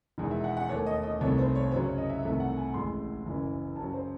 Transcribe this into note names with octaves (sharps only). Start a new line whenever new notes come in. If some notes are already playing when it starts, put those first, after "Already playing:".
E1 E2 D#3 G#3
E5
F#5
F#5
D#2 D#3 A3 C#5
D#5
D#5
C2 C3 D#3 A3 C#5
C5
C#5
F#2 C#3 F#3 C5
C#5
D#5
E5
C2 C3 D#3 A3 E5
F#5
G#5
A1 A2 G#3 C6
F#1 F#2 E3
F#2 C#3 F#3 A5
C5